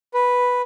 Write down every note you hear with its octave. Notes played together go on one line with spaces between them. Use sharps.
B4